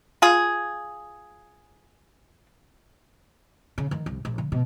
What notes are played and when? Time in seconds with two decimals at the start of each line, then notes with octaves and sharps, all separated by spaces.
0.22 F4 G#4
3.78 C#3
3.91 D#3
4.06 C2
4.25 A#1
4.38 D3
4.52 B2